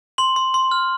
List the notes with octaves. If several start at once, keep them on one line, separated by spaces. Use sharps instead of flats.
C6 F#7
C6
C6
F6